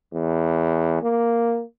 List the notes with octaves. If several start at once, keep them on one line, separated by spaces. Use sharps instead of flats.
E2
A#3